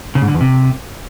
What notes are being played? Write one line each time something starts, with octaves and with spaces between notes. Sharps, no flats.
C#3
G#2
D3
E2
C3